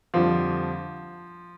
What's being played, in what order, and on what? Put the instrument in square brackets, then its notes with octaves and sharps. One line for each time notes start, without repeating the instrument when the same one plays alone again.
[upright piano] F2 D3 G3 C4 [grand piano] F3